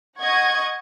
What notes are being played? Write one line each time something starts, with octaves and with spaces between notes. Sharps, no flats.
D#5 F#5 C#6 G#6